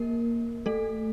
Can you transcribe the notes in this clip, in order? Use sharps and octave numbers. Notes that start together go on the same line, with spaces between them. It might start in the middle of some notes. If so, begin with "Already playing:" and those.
Already playing: A#3 A#4
A3 A4